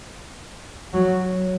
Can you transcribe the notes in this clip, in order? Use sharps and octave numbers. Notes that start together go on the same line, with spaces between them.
F#3